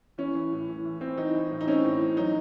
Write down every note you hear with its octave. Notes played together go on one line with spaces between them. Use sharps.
E3 C#4
E3
A2
E3
E3
C4
E3 D#4
E3
A2
D#4
C4 C#4
A2
E3
F#3 D#4